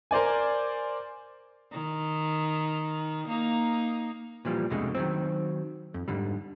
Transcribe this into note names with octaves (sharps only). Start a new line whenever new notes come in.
A#4 C5 D5 G#5
D#3
A#3 D#4
A#2 E3 F3 G3
C2 F2 B2 D3 G#3 A3
D#3 F#3 C4
F2
G#2 D3 G3